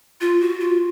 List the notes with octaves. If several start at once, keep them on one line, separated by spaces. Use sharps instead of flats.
F4
F#4
F4